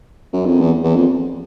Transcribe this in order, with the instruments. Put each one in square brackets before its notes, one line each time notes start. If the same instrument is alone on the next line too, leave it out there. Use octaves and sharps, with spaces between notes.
[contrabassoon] F#2
F2
E2
E2
F2